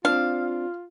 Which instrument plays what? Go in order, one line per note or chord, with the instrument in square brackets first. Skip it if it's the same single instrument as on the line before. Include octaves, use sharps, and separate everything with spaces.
[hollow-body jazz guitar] C4 D4 [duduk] F4 [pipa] F5